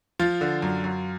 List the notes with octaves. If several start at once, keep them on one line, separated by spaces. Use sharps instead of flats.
F3 F4
D3
F#2
F#2